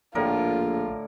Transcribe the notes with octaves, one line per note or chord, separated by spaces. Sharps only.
A#1 A2 D3 F4 A#4